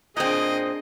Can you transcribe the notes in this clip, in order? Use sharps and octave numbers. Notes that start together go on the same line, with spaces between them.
A#2 C4 D4 G#4 D#5